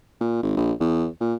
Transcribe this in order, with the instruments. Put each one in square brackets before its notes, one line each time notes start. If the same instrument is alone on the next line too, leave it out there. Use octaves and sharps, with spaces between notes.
[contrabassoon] A#2
G#1
A#1
E2
A#2